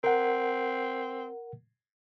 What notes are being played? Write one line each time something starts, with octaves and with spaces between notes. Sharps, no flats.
C4 A#4 F#5